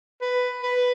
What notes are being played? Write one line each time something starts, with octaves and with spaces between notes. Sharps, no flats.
B4
B4